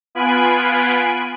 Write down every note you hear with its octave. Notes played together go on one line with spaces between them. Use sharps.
B3 F4 G#5 B5 F#6 D7